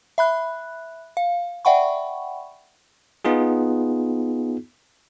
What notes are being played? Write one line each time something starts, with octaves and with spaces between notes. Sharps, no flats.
E5 B5 F#6
F5
D5 E5 F#5 G5 B5 C#6
B3 D#4 F4 G#4